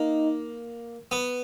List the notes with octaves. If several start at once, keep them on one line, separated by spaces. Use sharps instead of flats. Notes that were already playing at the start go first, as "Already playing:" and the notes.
Already playing: A#3 D#4
B3